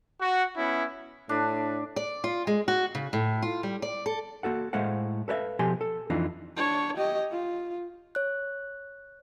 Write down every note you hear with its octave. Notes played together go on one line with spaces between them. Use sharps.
F#4
B3 C#4 E4
A2 D4
D5
F4
G#3
F#4
C#3
A2
F4
G3
D5
A4
A#3 F#4 A4 F#5
A2 G#3 A3 C5 F5 F#5
A4 B4 C#5 E5 F5
B2 F3 G4 A4 G#5 C6
A4
F2 E3 D4 D#4 F4
D4 C#5
G4 D#5
F4
C#5 F#6